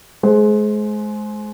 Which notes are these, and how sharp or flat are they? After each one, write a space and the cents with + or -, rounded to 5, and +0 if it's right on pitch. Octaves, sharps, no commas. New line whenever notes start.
G#3 +30 C5 +0